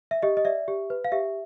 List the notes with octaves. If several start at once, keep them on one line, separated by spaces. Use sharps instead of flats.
E5
G4 D#5
D#5
D5 E5
G4
B4
F5
G4 E5